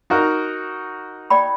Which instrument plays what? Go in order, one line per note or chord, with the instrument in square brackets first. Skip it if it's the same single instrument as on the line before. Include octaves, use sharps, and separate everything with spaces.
[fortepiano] D#4 F#4 A#4
[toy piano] D5 G5 B5